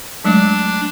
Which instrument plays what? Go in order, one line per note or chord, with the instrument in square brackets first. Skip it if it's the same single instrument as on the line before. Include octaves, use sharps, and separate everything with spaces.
[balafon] F#3 G#3 A3 [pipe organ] D4